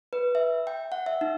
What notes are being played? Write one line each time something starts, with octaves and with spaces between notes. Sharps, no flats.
B4
E5
G5
F#5
E5
D#4